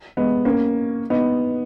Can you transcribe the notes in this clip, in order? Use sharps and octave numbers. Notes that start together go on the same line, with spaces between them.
G#3 B3
A#3 C#4
B3 D#4